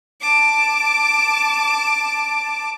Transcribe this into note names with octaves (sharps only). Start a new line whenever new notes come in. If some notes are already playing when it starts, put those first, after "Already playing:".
A5 D6